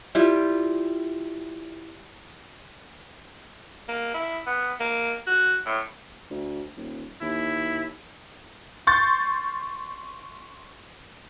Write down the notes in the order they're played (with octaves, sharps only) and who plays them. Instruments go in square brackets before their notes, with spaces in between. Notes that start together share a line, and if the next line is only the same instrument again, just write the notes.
[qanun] G3 E4 F4 G4
[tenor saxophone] A#3
E4
B3
A#3
F#4
A2
[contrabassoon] D2
D#1
[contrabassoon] D#2 [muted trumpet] E4
[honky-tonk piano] C6 C#6 G6 A6